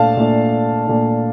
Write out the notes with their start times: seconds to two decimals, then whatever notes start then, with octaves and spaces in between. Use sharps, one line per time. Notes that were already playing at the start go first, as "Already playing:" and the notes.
Already playing: A#2 A3 D4 F5 A5
0.17 A#2 A3 D4
0.87 A#2 A3 D4